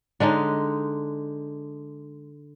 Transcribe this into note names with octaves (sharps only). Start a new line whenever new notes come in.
D3 G#3 D4 D#4